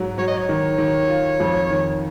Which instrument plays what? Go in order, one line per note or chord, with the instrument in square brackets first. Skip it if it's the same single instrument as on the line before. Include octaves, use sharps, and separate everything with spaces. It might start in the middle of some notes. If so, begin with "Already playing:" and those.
Already playing: [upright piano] G#2 F#3
[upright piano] F#3 [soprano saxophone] C#5
[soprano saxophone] D#5
C#5
[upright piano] D#3
D#3
F4
F2
D#3